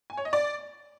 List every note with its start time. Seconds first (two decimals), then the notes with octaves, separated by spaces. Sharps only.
0.10 G#5
0.17 C#5
0.25 D#5
0.33 D5